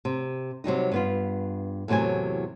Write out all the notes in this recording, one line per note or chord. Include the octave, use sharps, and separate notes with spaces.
C3
C3 F#3 G3 D#4
G2 B3 F4
E2 A2 C3 F#3 G#5